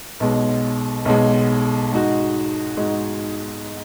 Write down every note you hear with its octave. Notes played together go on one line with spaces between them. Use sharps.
B1 B2 G#3
B1 B2 G#3
G#2 G#3 D#4 F#4
G#2 G#3 D#4 F#4